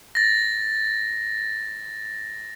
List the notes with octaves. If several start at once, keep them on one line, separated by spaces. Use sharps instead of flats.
A6 A#6